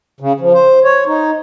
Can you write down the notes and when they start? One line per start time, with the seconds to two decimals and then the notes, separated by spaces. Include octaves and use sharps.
0.20 C#3
0.40 F3
0.53 C5
0.84 C#5
1.06 D#4